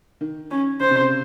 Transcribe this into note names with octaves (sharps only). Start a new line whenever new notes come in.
D#3
C#4
C#3 C5
C3
C#3